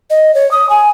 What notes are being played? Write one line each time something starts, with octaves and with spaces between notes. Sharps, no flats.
D#5
C#5
D#6
G#5